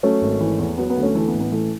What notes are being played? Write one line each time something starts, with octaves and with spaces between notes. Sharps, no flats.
F#3 A3 C#4
G#1
E3
E2
F#3 B3
B3
D2
A3 C#4
E3 A3
B3
A1
B3
E3 A3